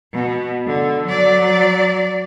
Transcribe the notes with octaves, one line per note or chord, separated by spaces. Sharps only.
B2
D3
F#3 D5